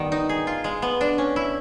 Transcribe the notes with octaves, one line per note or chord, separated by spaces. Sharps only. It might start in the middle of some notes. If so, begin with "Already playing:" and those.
Already playing: D#3 G3 B3
D#4
G#4
F4
G#3
B3
D4
C#4
E4